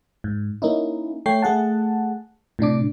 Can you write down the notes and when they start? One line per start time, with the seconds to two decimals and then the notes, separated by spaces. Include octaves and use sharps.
0.24 G#2
0.62 A#3 C#4 D#4 E4
1.26 A3 C#5 G5 C7
1.42 A3 G#4 F#5 A5
2.59 A2 C3 D4 D6